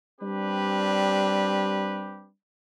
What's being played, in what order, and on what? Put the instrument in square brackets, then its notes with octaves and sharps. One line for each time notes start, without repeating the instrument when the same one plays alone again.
[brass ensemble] G3 C4 D4 G4 B4